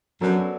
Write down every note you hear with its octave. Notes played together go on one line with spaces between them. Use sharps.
F#2 F#3 B3 D4 A4